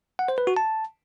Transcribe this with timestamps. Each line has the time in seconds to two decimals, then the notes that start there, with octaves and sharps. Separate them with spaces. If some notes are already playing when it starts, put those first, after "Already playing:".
0.19 F#5
0.28 C5
0.38 B4
0.47 F#4
0.57 A5